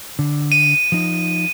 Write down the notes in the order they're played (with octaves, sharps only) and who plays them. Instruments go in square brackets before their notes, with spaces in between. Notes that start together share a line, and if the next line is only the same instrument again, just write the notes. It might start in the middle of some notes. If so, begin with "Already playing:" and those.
[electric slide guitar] D3
[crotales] D#7
[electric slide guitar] F3 D#4